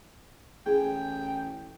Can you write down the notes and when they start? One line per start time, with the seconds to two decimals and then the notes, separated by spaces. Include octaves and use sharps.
0.66 A1 G#4 G5